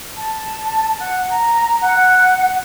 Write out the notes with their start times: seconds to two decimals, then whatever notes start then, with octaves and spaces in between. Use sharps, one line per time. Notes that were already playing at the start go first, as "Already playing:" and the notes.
0.17 A5
0.99 F#5
1.29 A#5
1.80 F#5